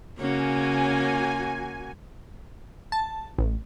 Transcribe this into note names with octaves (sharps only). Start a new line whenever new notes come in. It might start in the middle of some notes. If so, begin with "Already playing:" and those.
C#3 A#3 C#4 F#4 G#5
A5
A1